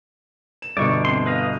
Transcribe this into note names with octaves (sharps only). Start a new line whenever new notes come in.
E7
G1 B2 D5 C#6
C4 C6
B4 D#5 F5